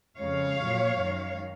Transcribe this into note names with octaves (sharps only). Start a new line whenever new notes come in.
F2 C#3 G#3 C#5 F5
A#2 F#3
F#2 D#3 G#3